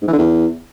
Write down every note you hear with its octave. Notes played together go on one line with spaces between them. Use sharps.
G#2
E3
D3
E2